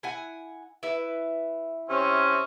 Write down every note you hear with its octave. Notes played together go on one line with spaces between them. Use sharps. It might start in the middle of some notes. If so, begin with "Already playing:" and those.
E4 F#5 G#5
E4 B4 E5
C3 C4 C#4